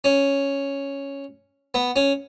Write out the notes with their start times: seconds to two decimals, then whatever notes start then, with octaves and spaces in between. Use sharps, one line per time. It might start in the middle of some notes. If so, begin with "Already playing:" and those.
0.04 C#4
1.74 B3
1.96 C#4